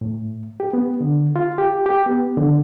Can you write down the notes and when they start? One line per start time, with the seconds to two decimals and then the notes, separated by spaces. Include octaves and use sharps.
0.01 A2
0.60 G4
0.73 B3
1.01 D3
1.36 F4
1.58 G4
1.86 G4
2.06 B3
2.37 D3